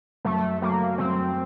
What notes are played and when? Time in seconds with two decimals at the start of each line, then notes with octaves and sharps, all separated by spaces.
0.25 F#2 A3
0.62 F#3 A3 A#3
0.98 F#2 C4